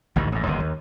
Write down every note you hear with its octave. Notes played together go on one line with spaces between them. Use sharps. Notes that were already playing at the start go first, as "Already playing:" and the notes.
A1 D2 G#2 D#3
A1 G#2
G1 D#2 C3
D#2